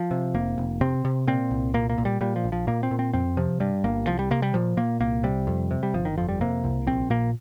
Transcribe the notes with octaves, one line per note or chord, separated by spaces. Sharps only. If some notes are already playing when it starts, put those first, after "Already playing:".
Already playing: F3
C3
F1 A#3
F1
C3 C4
C3
A#2 C4
C2
A#2 A#3
A#3
A#2
G3
A#2 G3
F3
A#1
F3
A#2 A#3
C4
A#2
C4
F2 C4
C3 F3
G2 G3
G1 A#3
C2 F3
G3
C3 A#3
G3
A#2 F3
A#2 A#3
C2 A#3
C3 G3
F2
C3
G3
G1 F3
D#3
F2 F3
G3
C3 A#3
C2
A#1 C4
A#2 A#3